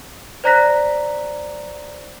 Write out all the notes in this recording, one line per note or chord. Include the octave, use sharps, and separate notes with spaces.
C5 D5 A#5 F#6 A#6 B6